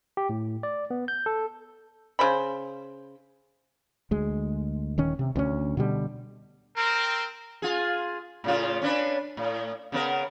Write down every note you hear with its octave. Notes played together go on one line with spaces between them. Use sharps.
G4
A2
D5
B3
G6
A4
C#3 C5 B5
D2 G#3
D#1 D#3 C#4
C3
D2 A#3 C#4
B2 D3 G3
C4 A#4
F4 G#4
A2 C#3 F4
C#4 D4 B4
A2
C#3 B3 A#4